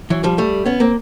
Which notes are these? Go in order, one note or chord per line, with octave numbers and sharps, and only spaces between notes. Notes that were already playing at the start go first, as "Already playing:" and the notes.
E3 F#3
F3 G3
G3 A3
B3 C#4
A#3 C4